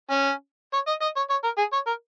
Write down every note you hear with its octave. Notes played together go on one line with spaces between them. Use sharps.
C#4
C#5
D#5
D#5
C#5
C#5
A#4
G#4
C#5
A#4